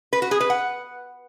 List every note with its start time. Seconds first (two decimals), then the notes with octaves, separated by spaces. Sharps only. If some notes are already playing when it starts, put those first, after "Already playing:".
0.13 B4
0.22 F#4
0.31 G#4
0.40 B4
0.50 F#5